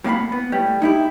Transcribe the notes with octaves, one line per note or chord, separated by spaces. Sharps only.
A2 A#3 F5 F#5 B5
B3
A2 G3 G4
D#4 E4 G4